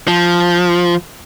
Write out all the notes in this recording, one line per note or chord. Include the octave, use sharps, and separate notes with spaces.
F3